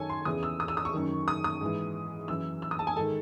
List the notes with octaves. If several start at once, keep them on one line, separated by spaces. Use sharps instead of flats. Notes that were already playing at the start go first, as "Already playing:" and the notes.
Already playing: F#2 D#3 A4 C#5 G#5
C6
E2 C#3 E3 D#6
E6
D#6
E6
D#6
C#6
F#2 D#3
D#6
D#6
G#2 E3
F#2 E3 E6
E6
D#6
A5
G#5
G#2 D#3 A4